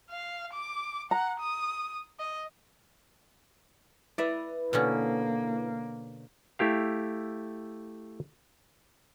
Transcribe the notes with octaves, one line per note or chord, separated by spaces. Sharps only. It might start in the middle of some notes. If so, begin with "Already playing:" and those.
F5
D6
F#5 A#5
D#6
D#5
E4 B4 D5 E5
B2 D3 A#3 C#4
A3 E4 G4 F5